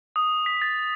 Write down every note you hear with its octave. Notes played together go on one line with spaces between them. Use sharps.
D#6
B6
A6